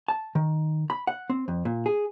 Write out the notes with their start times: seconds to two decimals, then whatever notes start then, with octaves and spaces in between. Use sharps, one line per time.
0.08 A5
0.35 D#3
0.90 B5
1.07 F#5
1.30 C4
1.48 F2
1.65 A#2
1.86 G#4